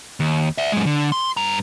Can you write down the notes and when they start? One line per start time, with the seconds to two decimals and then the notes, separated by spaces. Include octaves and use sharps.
0.20 D#2
0.58 D5 E5
0.72 F#2 G#3
0.86 D3
1.12 C6
1.37 G2 A#5